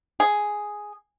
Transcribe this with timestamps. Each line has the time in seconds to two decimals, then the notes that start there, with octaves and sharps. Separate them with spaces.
0.20 G#4